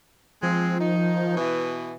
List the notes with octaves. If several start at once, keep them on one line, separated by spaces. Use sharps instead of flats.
F3 G#3 C4
D#3 D#4
B2 E3